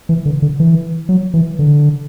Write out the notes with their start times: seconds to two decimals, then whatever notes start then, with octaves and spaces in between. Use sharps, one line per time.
0.09 E3
0.26 D3
0.42 D3
0.60 E3
1.09 F#3
1.34 E3
1.59 D3